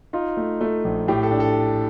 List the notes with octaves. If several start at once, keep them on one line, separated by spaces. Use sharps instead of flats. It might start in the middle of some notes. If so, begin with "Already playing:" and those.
D#4 F4
A3
A3
A#1
A2 G4
A4
D4
A4